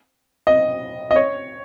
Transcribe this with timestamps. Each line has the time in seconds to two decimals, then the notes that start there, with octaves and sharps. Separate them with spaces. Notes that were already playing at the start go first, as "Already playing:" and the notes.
0.47 D#5
1.11 D#5
1.16 C#5